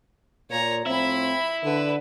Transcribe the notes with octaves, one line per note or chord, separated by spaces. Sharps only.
A#2 C#5 A#5
A2 F3 C4 E4 E5 B5
D3 B4